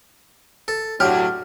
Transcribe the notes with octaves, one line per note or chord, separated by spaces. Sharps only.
A4
A2 D3 F#3 G4 F6